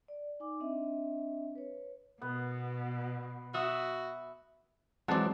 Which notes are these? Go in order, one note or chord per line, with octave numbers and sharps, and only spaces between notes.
D5
D#4 G#5 D6
C4 D4 D#5 E5
B4 C#5
B2 B3
F#4 E5 D#6 E6
E3 F#3 G#3 C4 G#4 D5 F#5 A5